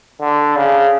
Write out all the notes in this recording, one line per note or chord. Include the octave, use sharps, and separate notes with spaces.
D3
C#3